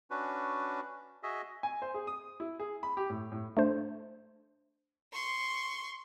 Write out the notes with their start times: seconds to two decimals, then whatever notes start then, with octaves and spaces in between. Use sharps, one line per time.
0.11 C#4 D4 F#4 B4
1.23 F#4 G#4 D#5 E5
1.63 G#5
1.82 C5
1.94 G#4
2.07 D#6
2.40 E4
2.60 G#4
2.83 B5
2.97 G4
3.10 A2
3.32 A2
3.57 A3 D4 C5
5.12 C6 C#6